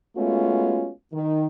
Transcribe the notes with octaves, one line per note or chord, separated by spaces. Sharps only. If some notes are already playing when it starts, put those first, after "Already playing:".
G#3 A3 B3 C#4 F4 F#4
D#3